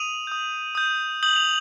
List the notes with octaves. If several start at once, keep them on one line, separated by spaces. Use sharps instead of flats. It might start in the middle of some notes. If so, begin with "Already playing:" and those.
Already playing: D#6 D#7 F7
D#6 G6
D#6 G6
D#6 G6 F#7
F7